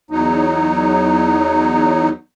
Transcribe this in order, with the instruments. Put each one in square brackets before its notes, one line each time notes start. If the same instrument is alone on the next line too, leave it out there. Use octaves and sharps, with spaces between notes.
[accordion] E2 F#3 D#4